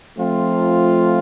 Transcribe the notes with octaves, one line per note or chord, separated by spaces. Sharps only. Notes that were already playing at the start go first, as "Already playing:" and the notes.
F3 A3 C4 F4